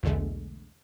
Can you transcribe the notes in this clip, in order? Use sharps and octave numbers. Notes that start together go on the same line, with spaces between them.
B1 E2 B2 D3 G#3 A3